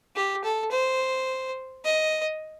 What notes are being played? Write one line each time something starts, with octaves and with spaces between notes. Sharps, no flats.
G4
A4
C5
D#5